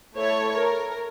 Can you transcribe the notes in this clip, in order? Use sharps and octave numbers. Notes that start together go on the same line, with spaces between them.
A3 E4 A4 C#5
A#4